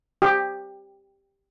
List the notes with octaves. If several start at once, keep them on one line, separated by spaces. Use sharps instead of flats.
G4